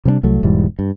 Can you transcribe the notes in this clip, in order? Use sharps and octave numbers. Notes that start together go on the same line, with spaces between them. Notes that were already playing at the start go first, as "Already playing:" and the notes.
C3 G3 C4 D4
C2 F#3 A3
E1 G#2 E3 G3
G2